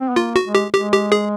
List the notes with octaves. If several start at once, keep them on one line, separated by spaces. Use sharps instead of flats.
C4
B3
A#3 F4
F#4
G#3
G4
G#3 G4
G4
G#4